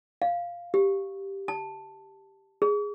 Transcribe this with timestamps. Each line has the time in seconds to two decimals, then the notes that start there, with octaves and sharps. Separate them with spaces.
0.22 F5
0.74 G4
1.48 A5
2.62 G#4